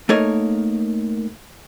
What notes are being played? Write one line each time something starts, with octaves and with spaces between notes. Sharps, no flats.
A3 A#3 D#4 A#4 C#5